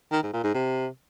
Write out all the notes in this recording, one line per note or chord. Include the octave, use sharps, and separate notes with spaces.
D#3
G#2
A#2
G#2
C3